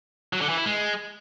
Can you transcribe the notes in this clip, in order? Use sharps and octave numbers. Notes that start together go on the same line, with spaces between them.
F#3
D3
E3
E4
G#3